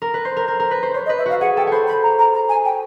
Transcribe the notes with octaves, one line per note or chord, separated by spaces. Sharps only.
A#4
B4
C5
A#4
A#4
A#4
B4
C5
C5 C#5
D#5
B4
E5
F#4 F5
G#4 F#5
A4 G5
C5 C#5 B5
B5
A#5
A#5
A#5
G#5
G5